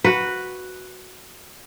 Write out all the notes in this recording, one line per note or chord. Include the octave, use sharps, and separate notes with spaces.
F#4 B4